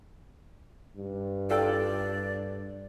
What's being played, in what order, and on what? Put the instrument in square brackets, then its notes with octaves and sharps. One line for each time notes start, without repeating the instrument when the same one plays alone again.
[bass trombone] G2
[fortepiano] F4 A4 G5 [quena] D5